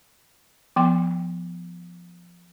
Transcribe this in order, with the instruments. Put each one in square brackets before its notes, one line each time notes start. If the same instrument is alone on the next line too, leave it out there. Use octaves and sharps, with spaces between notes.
[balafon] F3 B3 G5 C6